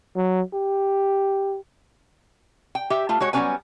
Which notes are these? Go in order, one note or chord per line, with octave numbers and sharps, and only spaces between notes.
F#3
G4
G5
G4 E5
A3 F4
G#3 F#4 C#5
F#3 G3 B3 C#4 B4 G#5